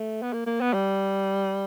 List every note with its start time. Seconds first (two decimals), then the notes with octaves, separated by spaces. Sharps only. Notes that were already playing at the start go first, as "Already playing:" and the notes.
Already playing: A3
0.22 B3
0.33 A#3
0.47 A#3
0.61 B3
0.73 G3